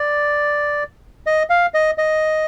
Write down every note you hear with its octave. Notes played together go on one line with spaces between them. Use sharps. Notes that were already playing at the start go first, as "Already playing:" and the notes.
Already playing: D5
D#5
F5
D#5
D#5